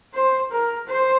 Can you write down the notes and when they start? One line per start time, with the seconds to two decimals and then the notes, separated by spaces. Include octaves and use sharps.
0.14 C5
0.51 A#4
0.87 C5